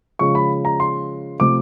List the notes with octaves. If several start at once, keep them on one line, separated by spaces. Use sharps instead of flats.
C#3 F3 G#3 C#6
B5
A#5
C6
C3 F3 A3 D6